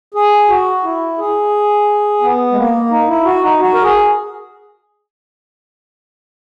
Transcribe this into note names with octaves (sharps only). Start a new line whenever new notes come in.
G#4
F#4
E4
G#4
B3
G#3
A#3
D#4
E4
F#4
D#4
F#4
A#4
G#4